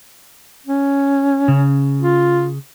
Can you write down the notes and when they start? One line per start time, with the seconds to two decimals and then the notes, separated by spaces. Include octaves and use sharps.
0.66 C#4
1.48 C#3
2.01 F4